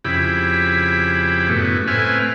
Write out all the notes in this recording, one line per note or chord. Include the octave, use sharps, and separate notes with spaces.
F2 C#3 E4 G4 B5
F#2 A2 B3
A2 C4 E4 B4 G#5 F6